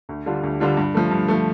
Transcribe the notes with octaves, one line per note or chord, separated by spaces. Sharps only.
D2
D3 G3 D4 F4
D2
D3 G3 D4 F4
G2
F3 A3
G2
F3 A3